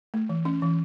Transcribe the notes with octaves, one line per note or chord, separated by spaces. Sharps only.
A3
E3
C#4
E3